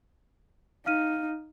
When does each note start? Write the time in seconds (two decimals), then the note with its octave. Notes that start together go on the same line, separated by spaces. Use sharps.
0.86 D#4 F5 F6 D#7